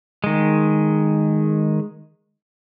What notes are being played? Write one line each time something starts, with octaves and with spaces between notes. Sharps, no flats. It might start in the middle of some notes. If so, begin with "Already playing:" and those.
D#3 G#3